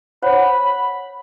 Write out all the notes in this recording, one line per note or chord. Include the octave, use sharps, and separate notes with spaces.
C5 C#5 F#5 B5